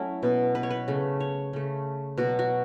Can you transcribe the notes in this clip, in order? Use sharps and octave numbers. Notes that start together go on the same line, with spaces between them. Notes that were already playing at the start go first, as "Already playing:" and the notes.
Already playing: F#3 A3 C#4 E4
B2 B3
B4
C#5
B4
C#3 A3
C#5
C#3 A3
B2 F#3 B3 F#4
F#4